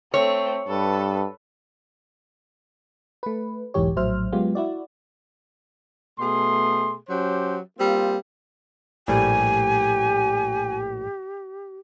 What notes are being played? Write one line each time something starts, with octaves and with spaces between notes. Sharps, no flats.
A3 C4 C#5
G2 A4 B4
A3 B4
B1 E2 G#2 E3 G4 C#5
A#1 A2 F#3 C5 E5 F6
F#3 G#3 B3 F4 G4
E4 F#4 D5
B2 A3 G#4 C6
F#3 C#4 G4 C5
G3 A#3 C4 F4
A#1 A2 G3 G4 G#5